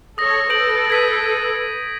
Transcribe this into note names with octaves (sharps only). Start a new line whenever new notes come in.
A4 C#5 D#6 A#6
A4 B4 G6 D7 F#7
G#6 B6 D#7